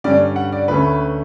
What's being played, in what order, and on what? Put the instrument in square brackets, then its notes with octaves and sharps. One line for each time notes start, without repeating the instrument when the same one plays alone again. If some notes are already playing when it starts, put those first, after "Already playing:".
[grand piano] G2 D3 G3 C#4 D5
F#5
D5
D2 D3 A3 C#4 B4